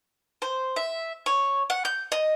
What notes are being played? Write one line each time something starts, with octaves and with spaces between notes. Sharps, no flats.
C5
E5
C#5
F#5
G6
D#5